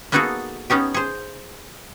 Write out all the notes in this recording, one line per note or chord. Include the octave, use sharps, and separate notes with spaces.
A#3 B3 D#4 F#4 G#4 A4
B3 C#4 D#4 G4
G#4 C5